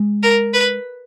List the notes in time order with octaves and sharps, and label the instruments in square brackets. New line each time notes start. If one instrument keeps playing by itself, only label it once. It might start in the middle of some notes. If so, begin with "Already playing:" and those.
Already playing: [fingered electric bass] G#3
[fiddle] A#4
B4